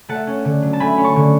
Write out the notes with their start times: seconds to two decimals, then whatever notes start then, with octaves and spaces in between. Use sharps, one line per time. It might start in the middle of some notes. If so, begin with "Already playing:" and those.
0.09 A3 F#5 A5
0.27 C#4
0.45 D3
0.62 F#3
0.73 A5
0.80 A3 G#5 B5
0.97 C#4
1.03 A5 C#6
1.16 D3